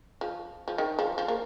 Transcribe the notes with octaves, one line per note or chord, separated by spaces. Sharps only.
F3
F3
D#3
F3
F3
A#3